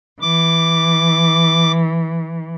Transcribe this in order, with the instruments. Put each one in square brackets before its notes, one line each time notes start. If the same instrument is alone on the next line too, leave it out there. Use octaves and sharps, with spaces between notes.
[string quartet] E3 [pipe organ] D6